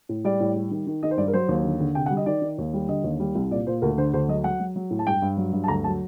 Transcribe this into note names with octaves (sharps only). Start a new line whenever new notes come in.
A2
G3 D5
A2
G3
D#3
D#3
D#3 D#5
C5
G2 D5
A#4
F#3 C5
D#2
D3
D3
C3 G5
F#5
G3
D#5
D#3 D5
D#3
D#2
G3
D3 D#5
D#2
G3
C2
A#2 D5
A#2 C5
D2 A#4
D3 C5
D2 C5
F#3 D#5
F#3 F#5
F#3
F#3
A2
A5
G2 G5
G2
F#3
G2
A5
D2 A#5
F#3 A5